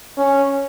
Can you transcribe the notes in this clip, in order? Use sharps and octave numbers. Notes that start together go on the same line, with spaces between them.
C#4